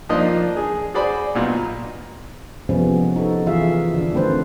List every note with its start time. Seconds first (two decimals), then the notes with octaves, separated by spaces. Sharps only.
0.09 F3 A#3 D4 D#4 F4 D#5
0.56 G#4
0.94 F#4 G#4 C5 D5 B5
1.35 B1 A#2
2.69 C3 F3 G#3 B3 C#4
3.16 D#4 F#4 A4
3.46 E3 F4 G#4 E5 F5
3.94 D3 D4
4.13 D#3 A3 C4 B4 C5